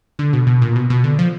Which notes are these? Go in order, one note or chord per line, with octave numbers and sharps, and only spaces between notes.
D3
B2
B2
A#2
B2
B2
D3
F3